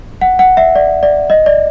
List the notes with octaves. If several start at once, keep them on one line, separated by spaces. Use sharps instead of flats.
F#5
F#5
E5
D5
D5
D#5
D5